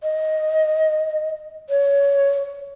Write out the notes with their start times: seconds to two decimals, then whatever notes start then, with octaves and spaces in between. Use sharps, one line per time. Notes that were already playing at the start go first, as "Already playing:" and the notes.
0.03 D#5
1.69 C#5